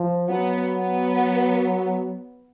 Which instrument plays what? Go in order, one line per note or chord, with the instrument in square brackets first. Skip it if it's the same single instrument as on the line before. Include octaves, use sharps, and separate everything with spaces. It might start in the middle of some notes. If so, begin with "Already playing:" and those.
Already playing: [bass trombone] F3
[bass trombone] F#3 [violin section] B3
[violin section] B3